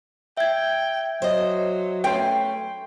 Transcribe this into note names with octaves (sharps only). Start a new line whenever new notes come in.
E5 G5 G#6
F#3 C5 D#5
A3 C#4 B4 G5 C6